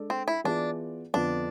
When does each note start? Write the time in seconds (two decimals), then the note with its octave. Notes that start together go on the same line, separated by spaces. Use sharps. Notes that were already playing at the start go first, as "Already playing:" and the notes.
Already playing: G#3 D4 A4 D5
0.10 C4
0.28 E4
0.44 E3 B3 D4 F4 G#4 D5
1.14 F2 D3 F3 B3 D4 F4